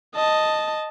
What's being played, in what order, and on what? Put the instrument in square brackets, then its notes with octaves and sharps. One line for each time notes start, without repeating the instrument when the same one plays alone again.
[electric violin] D#5 A5